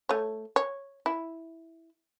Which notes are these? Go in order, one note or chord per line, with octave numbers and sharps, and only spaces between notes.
A3 C#5
C#5
E4